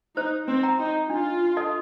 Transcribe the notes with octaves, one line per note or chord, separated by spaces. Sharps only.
D#4 C5
C4
G5 A#5
D#4
D4 F4
A4 D#5 A5